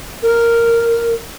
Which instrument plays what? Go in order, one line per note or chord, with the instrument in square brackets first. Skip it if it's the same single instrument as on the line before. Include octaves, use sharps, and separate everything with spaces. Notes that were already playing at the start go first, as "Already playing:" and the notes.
[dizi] A#4